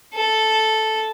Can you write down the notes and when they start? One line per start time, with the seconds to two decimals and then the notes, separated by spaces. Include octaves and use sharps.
0.14 A4